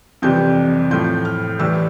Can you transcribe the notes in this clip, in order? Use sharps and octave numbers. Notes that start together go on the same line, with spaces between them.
F2 C3 E3 G3 G6
A2 F3 G6
F6
A2 E3 G3 E6